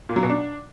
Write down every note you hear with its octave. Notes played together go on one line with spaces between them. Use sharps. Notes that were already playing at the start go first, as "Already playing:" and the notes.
A#2
F#3
B2
D4